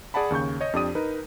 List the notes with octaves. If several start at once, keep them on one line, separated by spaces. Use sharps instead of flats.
G#4 D5 F#5 A5 B5
D#2 C#3 C#6 G6
C#5 D#5
F2 D4 G4 D5 D#6 D#7
D#4 A#4 B4